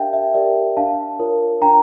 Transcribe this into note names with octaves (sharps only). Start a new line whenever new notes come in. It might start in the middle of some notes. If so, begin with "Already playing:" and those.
Already playing: D4 G4 A#4 D5 E5 F5 G5 A5
E5
G4 A#4 D5 E5
D4 F5 A5
F4 A#4 C#5
D4 G5 A#5